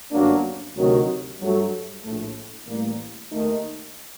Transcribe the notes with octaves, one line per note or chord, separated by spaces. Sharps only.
G1 F#2 F#3 A#3 D4
D2 C3 D#3 F#3
G2 F#3 A3
A#1 A2 A3
A1 A2 G3 A#3
D#2 D#3 A3 D#4